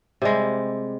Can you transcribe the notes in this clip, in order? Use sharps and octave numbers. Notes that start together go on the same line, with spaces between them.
C3 G3 G#3